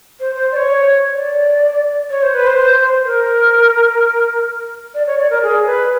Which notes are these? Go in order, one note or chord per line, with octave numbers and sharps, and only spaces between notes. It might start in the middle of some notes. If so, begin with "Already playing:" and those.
C5
C5
D5
C#5
D5
C#5
C5
B4
C5
A#4
D5
C#5
D5
A#4
G#4
B4